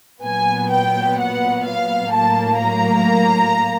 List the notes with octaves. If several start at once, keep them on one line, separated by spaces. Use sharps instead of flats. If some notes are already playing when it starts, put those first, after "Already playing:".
A#2 F#3 B3 G#5
G5
F#5
F5
A2 F#3 A#3 A5
A#5